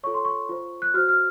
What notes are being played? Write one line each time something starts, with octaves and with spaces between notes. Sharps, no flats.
F4 A4 C#5 C#6
C6
C#6
F4 C5
F#6
F#4 C5 F6
F6